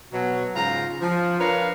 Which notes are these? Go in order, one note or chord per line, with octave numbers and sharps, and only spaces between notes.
B2 F#3
G#2 C#3 F4 A#5
F3
D4 A#4 B4 C#5 F5 A#5